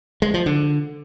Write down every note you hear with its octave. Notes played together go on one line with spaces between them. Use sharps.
G#3
F3
D3